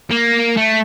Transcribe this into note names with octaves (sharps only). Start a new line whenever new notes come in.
A#3
A3